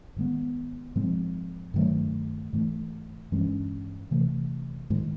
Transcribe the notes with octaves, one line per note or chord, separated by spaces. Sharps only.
G#2 D#3 G#3 B3
G#2 F3 G#3 C4
G2 D#3 F#3 A3
G#2 E3 A3
G2 E3 G#3 C#4
C3 E3 A3
G#2 D#3 G#3